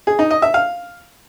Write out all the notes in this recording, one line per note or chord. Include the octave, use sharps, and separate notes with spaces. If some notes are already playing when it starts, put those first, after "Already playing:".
G#4
D#4
D#5
E5
F5